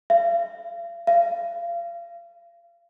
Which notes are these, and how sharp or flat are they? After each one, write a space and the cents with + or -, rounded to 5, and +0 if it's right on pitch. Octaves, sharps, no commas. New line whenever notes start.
F5 -40
F5 -35